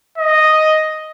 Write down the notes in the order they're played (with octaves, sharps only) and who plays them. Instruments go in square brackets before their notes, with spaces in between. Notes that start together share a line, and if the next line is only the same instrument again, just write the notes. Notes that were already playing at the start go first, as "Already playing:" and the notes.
[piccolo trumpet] D#5